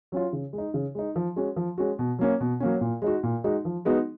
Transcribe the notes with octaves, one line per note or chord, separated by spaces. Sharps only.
F#3 C#4 F4
C#3
G#3
D#4
C#3
G#3 D#4
F3
G#3 C#4 F#4
F3
G#3 C#4 F#4
B2
F#3 A#3 C#4
B2
F#3 A#3 C#4
A#2
G#3 D#4 F#4
A#2
G#3 D#4 F#4
F3
G#3 B3 D#4 F#4